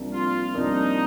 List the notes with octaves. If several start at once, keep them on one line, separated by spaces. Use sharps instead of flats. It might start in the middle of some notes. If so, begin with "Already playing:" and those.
Already playing: C2 C3 F3 A#3 D4
F4
C2 C3 F3 A#3 D4 D#4